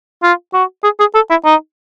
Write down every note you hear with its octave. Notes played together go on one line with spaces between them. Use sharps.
F4
F#4
G#4
G#4
A4
E4
D#4